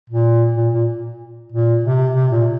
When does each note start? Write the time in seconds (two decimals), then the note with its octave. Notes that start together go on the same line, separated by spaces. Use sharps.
0.10 A#2
0.57 A#2
0.73 A#2
1.52 A#2
1.84 C3
2.15 C3
2.32 A#2